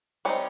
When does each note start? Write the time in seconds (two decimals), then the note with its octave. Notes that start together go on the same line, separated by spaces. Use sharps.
0.25 G3 C4 C#4 D#4 C#5